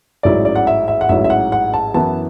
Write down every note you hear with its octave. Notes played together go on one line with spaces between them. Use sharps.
A1 G#2 F#3 C#4 E4 D5
D5
F#5
E5
E5
F#5
A1 G#2 F#3 C#4 E4 E5
E5
F#5
F#5
A5
F#2 E3 B3 E4 A5